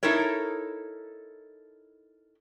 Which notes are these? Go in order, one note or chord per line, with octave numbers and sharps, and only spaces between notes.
D#4 E4 A4 A#4 C#5